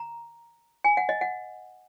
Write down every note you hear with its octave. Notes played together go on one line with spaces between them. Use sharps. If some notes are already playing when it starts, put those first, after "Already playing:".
Already playing: A#5
G#5
F#5
D#5
F#5